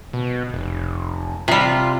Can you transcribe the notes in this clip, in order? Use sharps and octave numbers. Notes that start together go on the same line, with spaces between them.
B2
F1
C3 G3 F4